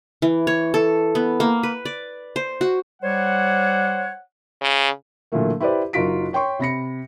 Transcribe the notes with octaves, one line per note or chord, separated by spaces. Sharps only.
E3
C#5
A4
B3
A#3
B4
D5
C5
F#4
G3 C5 C#5 F#5
C#3
A#2 D3 E3 F#3 A3 A#3
E4 G4 B4 C5 D5
F#1 D#4 F4 F#4 B6 D7
C#5 G5 C6 C#6
C3 B5 A#6 C#7